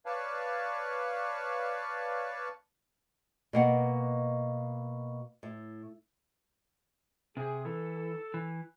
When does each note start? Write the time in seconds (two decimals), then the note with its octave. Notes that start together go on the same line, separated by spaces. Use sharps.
0.06 B4 C#5 D5 F5 A5
3.53 B2 A#3 F#5
5.43 A2
7.37 C3 G#4
7.65 E3 A4
8.34 E3